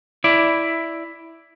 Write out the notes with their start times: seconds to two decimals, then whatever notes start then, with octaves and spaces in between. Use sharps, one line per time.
0.24 E4 D5